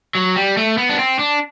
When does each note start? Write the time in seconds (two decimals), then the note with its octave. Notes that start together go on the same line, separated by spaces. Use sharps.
0.15 F#3
0.36 G3
0.57 A3
0.78 B3
0.89 D4
0.99 C4
1.19 D4